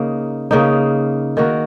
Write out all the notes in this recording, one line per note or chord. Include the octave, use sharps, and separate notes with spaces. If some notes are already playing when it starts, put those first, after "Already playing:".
Already playing: C#3 A#3 D#4
C#3 A#3 D#4
D#3 A#3 F#4 A#4